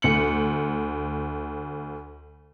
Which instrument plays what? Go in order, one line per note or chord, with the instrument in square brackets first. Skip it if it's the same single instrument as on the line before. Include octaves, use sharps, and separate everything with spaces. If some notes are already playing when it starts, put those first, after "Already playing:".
[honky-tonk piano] D2 C#7 F#7